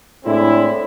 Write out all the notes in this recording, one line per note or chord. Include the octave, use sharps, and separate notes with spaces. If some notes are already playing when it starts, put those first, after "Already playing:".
A2 G#3 C4 D4 E4